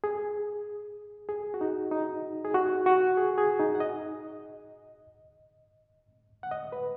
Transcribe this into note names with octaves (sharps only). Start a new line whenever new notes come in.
G#4
G#4
F#4
D#4
D#4
G#4
F#4
F#4
G#4
G#4
D#4
F#5
D#5
F#5
D#5
B4